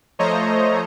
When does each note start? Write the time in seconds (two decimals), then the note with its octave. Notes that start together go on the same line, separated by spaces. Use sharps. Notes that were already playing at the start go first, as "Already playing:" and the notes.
0.19 F3 A3 C5 C#5 D#5 A#5